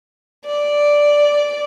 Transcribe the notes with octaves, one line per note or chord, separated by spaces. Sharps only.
D5